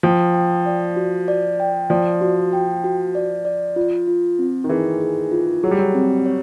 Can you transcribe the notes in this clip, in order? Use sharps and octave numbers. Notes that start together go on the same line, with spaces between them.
F3 G5
G5
D5
F#4
D5
G5
F3 D5
F#4
G5
F#4
D5
D5
F4
F4
C4
D#3
E3 G#4
G#4
F4
F#3 G#4
G3
F#3
C4
C#5